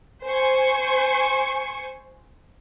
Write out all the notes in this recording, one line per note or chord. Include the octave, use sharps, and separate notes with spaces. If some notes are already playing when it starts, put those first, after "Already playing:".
C5 G#5 C#6